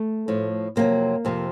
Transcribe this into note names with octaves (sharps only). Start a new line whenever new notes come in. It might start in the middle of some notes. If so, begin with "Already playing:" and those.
Already playing: A3
A2 F3
F2 C3 D#3 F#3 A#3
F2 C3 F3